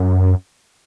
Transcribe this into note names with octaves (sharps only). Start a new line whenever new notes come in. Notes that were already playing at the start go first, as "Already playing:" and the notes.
Already playing: F#2